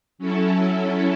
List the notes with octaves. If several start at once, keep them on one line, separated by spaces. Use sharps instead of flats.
F#3 C#4 E4 A4